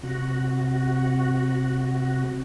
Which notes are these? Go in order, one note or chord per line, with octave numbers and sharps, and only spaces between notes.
C3 F#4